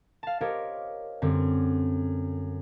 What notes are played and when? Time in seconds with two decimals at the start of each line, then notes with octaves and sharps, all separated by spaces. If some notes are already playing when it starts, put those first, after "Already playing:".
0.23 F5 A5
0.41 G4 A#4 C5 C#5 D#5 F5
1.22 F#2 D3 G3 C4